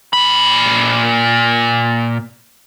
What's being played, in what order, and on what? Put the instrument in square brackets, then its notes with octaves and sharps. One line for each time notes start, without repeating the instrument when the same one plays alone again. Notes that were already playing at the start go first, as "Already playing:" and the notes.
[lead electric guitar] A#2 B5